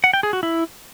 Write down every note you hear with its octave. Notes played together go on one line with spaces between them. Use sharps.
F#5
G5
G#4
F#4
E4